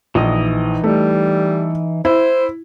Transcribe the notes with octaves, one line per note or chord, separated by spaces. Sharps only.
A#1 E3 D#4 D#5
G3 A3
E4 C5